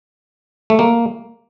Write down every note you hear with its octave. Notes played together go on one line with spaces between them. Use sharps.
A3
A#3